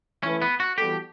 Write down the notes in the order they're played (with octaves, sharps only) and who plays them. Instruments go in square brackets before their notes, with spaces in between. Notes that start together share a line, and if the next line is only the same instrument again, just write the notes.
[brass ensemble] E3 A3 E4 B4 [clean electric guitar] C#4
[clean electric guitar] B3
F#4
[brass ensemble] E3 G3 B3 F#4 A4 [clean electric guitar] G4